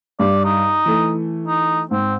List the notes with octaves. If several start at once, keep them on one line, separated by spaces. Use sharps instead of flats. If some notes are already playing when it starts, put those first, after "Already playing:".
G2 G3 D5
D#4
E3 A3
D#4
G#2 C4